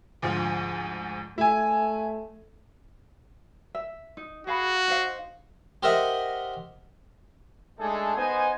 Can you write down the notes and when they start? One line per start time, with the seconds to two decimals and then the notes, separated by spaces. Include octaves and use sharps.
0.22 D2 G#2 F3
1.38 A3 E4 G#5
3.75 E5
4.17 D#4
4.47 F#4 G#4 F5 B5
4.88 D#4 C5 F5
5.83 G4 A#4 C5 D#5 E5 F#5
7.79 G#3 A3 D4 D#4 G#4 A4
8.17 B3 D#4 C5 G#5